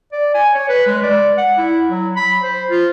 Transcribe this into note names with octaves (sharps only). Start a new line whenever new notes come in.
D5
G#5
C#5
B4
G#3
D5
F#5
E4
F#3
B5
C5
F4